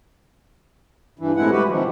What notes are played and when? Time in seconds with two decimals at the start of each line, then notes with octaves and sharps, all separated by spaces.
1.19 G2 E3
1.37 A2 C3 G#3 E4 F#5
1.52 G3 F#4 G4 B4
1.69 C3 D#3 F3